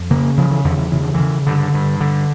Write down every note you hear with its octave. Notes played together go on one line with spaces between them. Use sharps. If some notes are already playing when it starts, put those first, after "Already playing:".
Already playing: F2
C#3 A#3
C#3 F3
E3
E2 D3
E3
C#3 E3
D3
C#3 E3
G2 D3
G2
D3